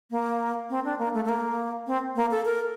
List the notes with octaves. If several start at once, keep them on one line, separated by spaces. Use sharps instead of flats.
A#3
C4
D4
A#3
A3
A3
A#3
C4
A#3
A4
A#4